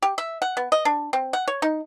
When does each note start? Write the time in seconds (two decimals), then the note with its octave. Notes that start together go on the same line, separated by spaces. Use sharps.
0.02 G4
0.18 E5
0.42 F#5
0.57 B3
0.72 D#5
0.85 D4
1.13 C4
1.33 F#5
1.48 C#5
1.62 D#4